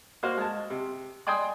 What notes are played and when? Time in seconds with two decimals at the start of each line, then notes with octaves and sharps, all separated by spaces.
0.23 A#3 F#4 C5 F5
0.37 G#3 A5
0.70 C3
1.27 D5 G5 G#5 C6 D#6